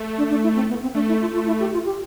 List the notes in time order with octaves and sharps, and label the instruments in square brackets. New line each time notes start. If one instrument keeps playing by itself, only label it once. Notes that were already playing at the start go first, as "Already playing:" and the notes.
Already playing: [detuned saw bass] A3
[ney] D4
D4
E4
C4
B3
C4
[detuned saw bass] A3 [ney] D4
[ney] E4
F4
F4
E4
G4
F4
G4